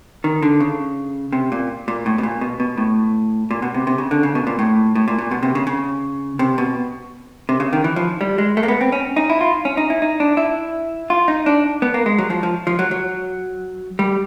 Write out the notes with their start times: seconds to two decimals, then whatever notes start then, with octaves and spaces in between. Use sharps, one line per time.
0.24 D#3
0.42 D3
0.60 C#3
1.33 C3
1.52 A#2
1.88 A#2
2.06 A2
2.18 B2
2.23 A#2
2.41 B2
2.60 B2
2.78 A2
3.51 A#2
3.62 B2
3.74 C3
3.87 C3
3.98 C#3
4.11 D3
4.23 C#3
4.35 B2
4.47 A#2
4.59 A2
4.95 A2
5.08 A#2
5.18 A#2
5.31 B2
5.43 C3
5.55 C#3
5.67 C#3
6.39 C3
6.58 B2
7.49 C3
7.60 C#3
7.73 D#3
7.84 E3
7.96 F3
8.21 G3
8.38 G#3
8.57 A3
8.63 A#3
8.68 B3
8.81 C4
8.92 C#4
9.16 D#4
9.30 E4
9.41 F4
9.65 C#4
9.77 D#4
9.90 E4
10.02 D#4
10.20 D4
10.37 E4
11.10 F4
11.28 D#4
11.46 D4
11.82 B3
11.94 A#3
12.06 G#3
12.18 F#3
12.30 F3
12.43 F3
12.67 F3
12.79 F#3
12.91 F#3
13.99 G3